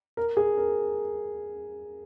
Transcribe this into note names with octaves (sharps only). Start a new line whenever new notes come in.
A#4
G#4
A#4